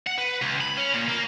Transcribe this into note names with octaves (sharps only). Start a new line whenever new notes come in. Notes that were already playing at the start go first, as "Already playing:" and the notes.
F#5
B4
C#2
B5
C#4
A#2
A#3